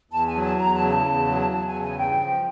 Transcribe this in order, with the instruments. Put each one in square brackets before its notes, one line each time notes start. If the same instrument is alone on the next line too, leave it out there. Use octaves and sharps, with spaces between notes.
[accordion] E2 [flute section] A5
[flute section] G#5
[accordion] F#3
[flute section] A5
[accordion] E2 [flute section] A#5
[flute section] A5
[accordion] C#3
[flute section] A5
[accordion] E2
F#3
[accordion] E2 [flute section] A5
[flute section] G#5
[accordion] C#3
[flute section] G#5
[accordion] G2 [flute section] G5
[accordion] F3